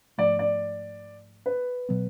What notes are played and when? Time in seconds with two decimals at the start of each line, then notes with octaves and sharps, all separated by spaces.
0.18 G#2 F3 A3 D5
0.39 D5
1.46 B4
1.89 B2 F#3 B3